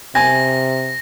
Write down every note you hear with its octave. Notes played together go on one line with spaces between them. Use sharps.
C3 G#5 A#6